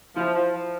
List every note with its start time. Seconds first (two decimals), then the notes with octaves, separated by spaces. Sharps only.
0.16 F3 E4
0.34 F3
0.53 F3